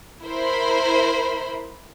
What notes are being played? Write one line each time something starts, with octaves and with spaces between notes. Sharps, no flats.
E4 A#4 C5 B5